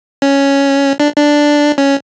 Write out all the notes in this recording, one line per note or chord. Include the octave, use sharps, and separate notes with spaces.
C#4
D4
D4
C#4